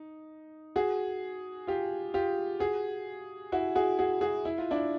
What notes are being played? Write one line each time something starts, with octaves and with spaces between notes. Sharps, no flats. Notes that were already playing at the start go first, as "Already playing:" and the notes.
Already playing: D#4
F#4 G#4
F4 G4
F4 G4
F#4 G#4
E4 F#4
F#4 G#4
F#4 G#4
F#4 G#4
E4
F4
D4 E4